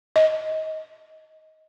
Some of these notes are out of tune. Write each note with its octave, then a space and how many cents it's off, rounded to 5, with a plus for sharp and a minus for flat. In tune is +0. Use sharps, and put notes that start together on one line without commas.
D#5 +15